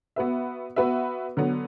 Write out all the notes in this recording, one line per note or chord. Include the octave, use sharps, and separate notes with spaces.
B3 F#4 B4 E5
B3 F#4 B4 E5
D3 F#3 B3